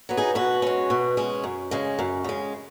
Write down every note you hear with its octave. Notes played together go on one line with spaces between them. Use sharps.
F#3 B3
D#4 G#4
B2 F#4 B4
G#3 C#4
B2
G#3 C#4
F#2
C#3 G#3
F#2
C#3 G#3